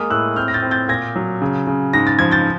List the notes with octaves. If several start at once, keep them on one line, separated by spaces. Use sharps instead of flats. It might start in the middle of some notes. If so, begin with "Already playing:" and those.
Already playing: G#3 A#3 D#6 F6
A2 E6 F#6
C4 F6 G6
A#6
G6 A6
C4
G6 A6
A#2 G#6 A#6
F#3
C#3
C#3
G#2 A#6
A6
F3 G#6
G6 A6